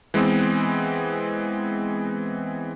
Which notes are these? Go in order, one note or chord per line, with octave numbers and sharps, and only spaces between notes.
E3 G#3 B3 C4